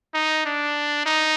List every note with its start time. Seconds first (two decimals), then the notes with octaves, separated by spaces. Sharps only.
0.14 D#4
0.45 D4
1.06 D#4